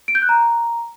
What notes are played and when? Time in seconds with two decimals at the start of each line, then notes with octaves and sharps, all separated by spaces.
0.08 D7
0.15 G6
0.22 F#6
0.29 A#5